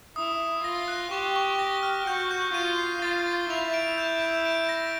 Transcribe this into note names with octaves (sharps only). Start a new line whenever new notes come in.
E4 D#6
D#6
F4 A#6
F#6
G4 C#6
C#6
A#6
F6
F#4 G6
G6
F4 D#7
C7
F4 A6
A6
E4 F7
D7
G6
G6
D7
A#6